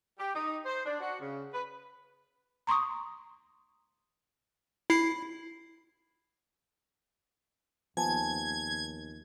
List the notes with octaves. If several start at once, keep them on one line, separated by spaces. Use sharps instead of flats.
G4
D#4
C5
D4
F#4
C#3
B4
A#5 C6 C#6 D#6
E4 C7
D#2 F3 B3 G#5 A5 G#6